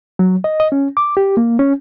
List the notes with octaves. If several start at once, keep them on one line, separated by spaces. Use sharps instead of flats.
F#3
D#5
D#5
C#4
D6
G4
A#3
C#4